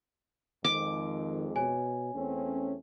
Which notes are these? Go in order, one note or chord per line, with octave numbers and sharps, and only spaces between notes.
F2 D#3 G#3 D6
B2 C#5 G#5
E2 A3 C4 C#4